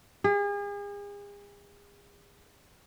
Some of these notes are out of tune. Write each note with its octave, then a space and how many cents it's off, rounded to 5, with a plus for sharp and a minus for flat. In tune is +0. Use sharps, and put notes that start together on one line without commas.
G#4 -40